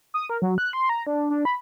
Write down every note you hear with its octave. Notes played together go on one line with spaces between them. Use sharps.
D#6
A#4
F#3
F#6
C6
A#5
D4
D4
B5